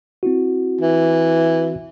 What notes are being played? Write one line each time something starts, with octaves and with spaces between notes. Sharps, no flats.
C4 E4 F#4
E3